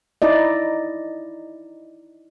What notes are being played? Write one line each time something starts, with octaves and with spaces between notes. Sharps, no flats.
D#4 E4 D5 D#5